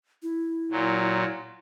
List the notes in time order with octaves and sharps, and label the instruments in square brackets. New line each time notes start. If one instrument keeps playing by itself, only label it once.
[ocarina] E4
[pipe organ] A#2 F#3